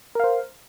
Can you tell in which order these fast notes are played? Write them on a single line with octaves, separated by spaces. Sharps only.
A#4 F5 C5